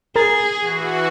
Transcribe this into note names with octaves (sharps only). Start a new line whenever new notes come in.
G#4 A#4 A#5 A6
E3 F#4